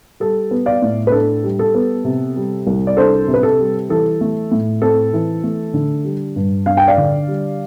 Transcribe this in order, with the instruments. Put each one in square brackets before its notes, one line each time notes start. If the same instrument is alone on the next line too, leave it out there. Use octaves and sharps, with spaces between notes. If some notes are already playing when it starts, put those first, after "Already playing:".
[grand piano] G3 A4
B3
D5 F5
A2
B4
D4 A4
G3
A4
B3
C3
G3
C2
D5
D4 A4 C5
C3
B4
A4
G3
E3 A4
A3
A2
C4 A4
E3
A3
D3
G3
G2
D4 F5
G5
D5 F5
D3
G3